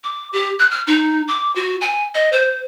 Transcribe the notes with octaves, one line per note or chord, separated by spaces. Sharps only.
D6
G4
F#6
F6
D#4
D6
F#4
G#5
D#5
C5